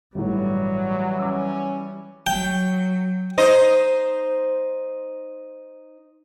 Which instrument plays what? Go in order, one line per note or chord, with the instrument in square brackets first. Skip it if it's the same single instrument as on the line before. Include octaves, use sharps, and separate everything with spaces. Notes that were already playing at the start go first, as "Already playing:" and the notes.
[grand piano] G1 A2 [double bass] E3 G3 [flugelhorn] F#3
[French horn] C#4 [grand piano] D6 E6
[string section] F#3 [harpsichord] G5
[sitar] D#4 C5 D#5